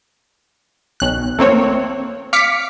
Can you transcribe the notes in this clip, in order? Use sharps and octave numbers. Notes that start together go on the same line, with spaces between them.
B1 F#6
A3 A#3 C4 C#5
F5 D6 B6 C#7